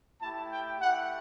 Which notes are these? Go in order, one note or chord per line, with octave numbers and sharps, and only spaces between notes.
A3 E4 G4 A5
G5
A3 E4 G4 F#5